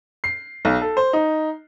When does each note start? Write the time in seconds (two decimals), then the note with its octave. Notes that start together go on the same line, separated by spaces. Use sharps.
0.24 C7
0.65 B1
0.81 A4
0.97 C5
1.13 D#4